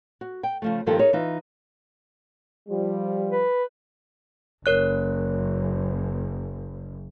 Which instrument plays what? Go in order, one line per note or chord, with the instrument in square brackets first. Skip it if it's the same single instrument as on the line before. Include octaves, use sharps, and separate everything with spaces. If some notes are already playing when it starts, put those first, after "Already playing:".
[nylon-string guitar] F#4
G5
C#3 F3 A3
G2 D#3 F3 A#3 G4 A4
D#4 G#4 A#4 C#5
E3 D#4 F4
[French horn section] F3 G3
[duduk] B4
[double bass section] F#1 [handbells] A#4 C#5 F#6